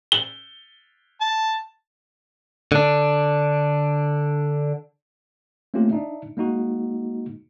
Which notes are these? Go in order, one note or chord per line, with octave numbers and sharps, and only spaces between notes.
G7
A5
D3 D4
A3 A#3 C4 C#4 F4 G4
D4 D#4 E5
G#3 A#3 D#4 F#4